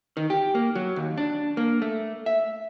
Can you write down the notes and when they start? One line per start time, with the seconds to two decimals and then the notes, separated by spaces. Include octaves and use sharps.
0.17 D#3
0.30 G4
0.55 A#3
0.75 F#3
0.96 D#2
1.17 D4
1.57 A#3
1.82 A3
2.26 E5